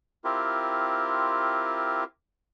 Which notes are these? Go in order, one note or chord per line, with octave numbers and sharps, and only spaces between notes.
C4 E4 F4 G4 A#4